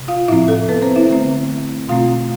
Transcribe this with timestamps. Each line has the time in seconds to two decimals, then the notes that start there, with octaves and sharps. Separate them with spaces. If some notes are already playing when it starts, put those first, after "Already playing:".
Already playing: C3
0.08 F4 F5
0.28 A2 F3 C4 E4 E5
0.48 A4
0.69 B3 B4
0.82 C4 C5
0.96 E4 E5
1.09 D3 A3 C4
1.89 B2 A3 C4 F4 F5